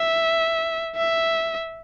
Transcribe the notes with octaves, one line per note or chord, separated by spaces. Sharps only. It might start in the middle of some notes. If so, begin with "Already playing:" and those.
Already playing: E5
E5